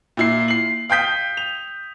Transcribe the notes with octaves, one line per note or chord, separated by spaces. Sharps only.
A#2 E4 C7
C7 F#7
F5 G5 D#6 G6 B6 G7
F7